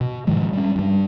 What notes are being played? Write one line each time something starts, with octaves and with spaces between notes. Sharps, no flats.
B2
G#2 D#3 F3 G#3
G3 C#4
G2 G3